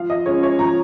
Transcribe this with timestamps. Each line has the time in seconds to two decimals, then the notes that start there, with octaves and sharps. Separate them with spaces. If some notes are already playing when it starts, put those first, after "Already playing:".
Already playing: F3 F5
0.10 D#5
0.26 G#3 C#4 F4 C#5
0.43 C#5
0.59 F3 A#5